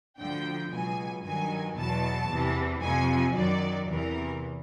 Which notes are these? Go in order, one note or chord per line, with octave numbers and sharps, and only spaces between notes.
D2 D3 F3 G5
C#2 B2 F#3 G#5
G2 D#3 F#3 G#5
E2 B2 F#3 A5
E2 C3 E3
F2 C3 F3 G#5
F#2 D#3 F#3 D5
E2 C3 E3 A#4